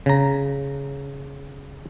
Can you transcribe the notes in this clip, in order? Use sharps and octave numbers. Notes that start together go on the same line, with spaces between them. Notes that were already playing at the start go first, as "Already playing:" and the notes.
C#3 A#5